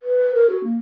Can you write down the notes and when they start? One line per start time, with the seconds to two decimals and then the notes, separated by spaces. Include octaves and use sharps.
0.03 B4
0.34 A#4
0.49 F#4
0.64 A#3